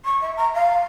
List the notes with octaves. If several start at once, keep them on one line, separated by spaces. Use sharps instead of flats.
C#6
E5
A#5
F5